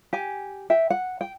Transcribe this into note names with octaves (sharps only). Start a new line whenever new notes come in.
G4 G#5
E5 G5
F#5
G5